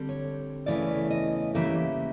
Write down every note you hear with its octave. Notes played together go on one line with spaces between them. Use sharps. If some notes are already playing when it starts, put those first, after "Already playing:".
Already playing: D3 G3 C4
C#5
E2 C#3 E3 A3 C#4 D5
D#5
C#3 E3 G3 A#3 E5